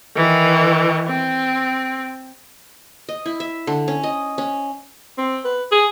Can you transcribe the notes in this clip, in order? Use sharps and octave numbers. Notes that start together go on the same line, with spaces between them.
D#3 E3
C4
D#5
E4
E5
D3
C#4
D#5
C#4
C4
B4
G#4